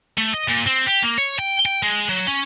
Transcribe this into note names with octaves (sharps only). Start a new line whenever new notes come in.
A3
D#5
A#2
C4
G4
A#3
C#5
G5
G5
G#3
F#3
C#4